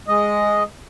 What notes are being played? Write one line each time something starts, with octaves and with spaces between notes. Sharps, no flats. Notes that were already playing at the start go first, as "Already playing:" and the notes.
G#3 D#5